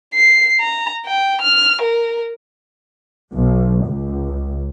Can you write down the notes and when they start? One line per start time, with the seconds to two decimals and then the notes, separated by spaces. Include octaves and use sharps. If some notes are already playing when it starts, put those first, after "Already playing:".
0.14 C7
0.60 A#5
1.05 G5
1.41 F6
1.82 A#4
3.34 B1
3.86 C#2